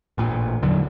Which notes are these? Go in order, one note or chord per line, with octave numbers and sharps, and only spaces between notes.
A1 A#2
A#1 E2 D3 F#3